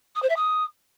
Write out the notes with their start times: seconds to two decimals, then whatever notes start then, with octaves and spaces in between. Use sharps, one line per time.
0.15 D#6
0.22 C5
0.29 E5
0.36 D#6